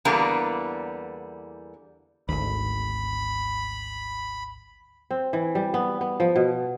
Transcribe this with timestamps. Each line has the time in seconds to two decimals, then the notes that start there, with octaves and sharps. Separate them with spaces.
0.05 E2 D3 G3 A#3 B3
2.29 G#1 D2 B5
5.11 C4
5.33 E3
5.55 G3
5.74 B3
6.01 B3
6.20 F3
6.36 B2